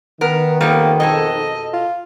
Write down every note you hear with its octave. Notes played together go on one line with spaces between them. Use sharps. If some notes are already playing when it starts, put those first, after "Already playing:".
D#3 B3 A#4
F2 G3 A#3 B3
B2 G#4 A4 D#5
F4